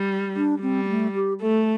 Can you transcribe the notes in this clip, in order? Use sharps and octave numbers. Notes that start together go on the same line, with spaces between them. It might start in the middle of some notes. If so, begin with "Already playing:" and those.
Already playing: G3
D4
G3 C4
C4
A3
G4
A3 A4